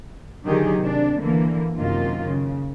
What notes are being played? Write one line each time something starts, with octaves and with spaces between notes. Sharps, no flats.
D3 D#3 F#3 G4 G#4
C3 D4
D3 E3 A#3
F#2 C3 D#3 A#3 F4
C#3